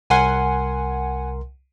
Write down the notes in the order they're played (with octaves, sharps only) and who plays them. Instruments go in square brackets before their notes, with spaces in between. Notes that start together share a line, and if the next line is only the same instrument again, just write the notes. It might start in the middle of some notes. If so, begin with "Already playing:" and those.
[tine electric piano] C2 A#4 C6 [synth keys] F#5 G#5